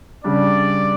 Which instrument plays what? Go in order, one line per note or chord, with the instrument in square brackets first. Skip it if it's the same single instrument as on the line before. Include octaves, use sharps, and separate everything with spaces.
[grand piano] C#3 G3 D4 [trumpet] D5